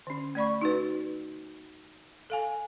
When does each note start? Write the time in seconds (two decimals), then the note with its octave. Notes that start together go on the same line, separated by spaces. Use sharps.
0.07 D3 C#4
0.35 A3 D5 B5 C#6
0.61 D#4 F#4 B4
2.30 A4 F5 G#5